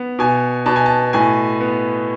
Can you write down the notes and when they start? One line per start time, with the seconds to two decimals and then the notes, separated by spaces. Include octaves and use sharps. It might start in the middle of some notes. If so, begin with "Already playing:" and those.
Already playing: B3
0.19 B2 G#5
0.66 B2 A5
0.76 G#5
0.86 A5
1.13 A2 G#5
1.61 B3